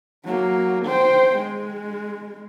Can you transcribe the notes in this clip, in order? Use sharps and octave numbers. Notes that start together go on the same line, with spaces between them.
F#3 A#3
C5 G5
G#3